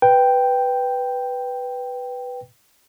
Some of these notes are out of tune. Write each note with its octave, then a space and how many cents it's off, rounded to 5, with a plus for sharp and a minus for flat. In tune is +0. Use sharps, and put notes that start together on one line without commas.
B4 +0 G5 +0